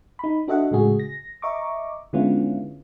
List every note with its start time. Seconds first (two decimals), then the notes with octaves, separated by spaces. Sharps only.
0.19 D#4 B5
0.48 D4 F#4 A4 D#5 E5 F#5
0.71 A2 C#3 G#3 F#4 G#4
0.99 A#6
1.42 D#5 E5 A#5 C#6 D6
2.13 D3 G#3 B3 C#4 E4 F4